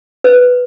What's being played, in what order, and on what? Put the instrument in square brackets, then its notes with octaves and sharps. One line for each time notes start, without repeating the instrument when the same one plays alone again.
[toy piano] B4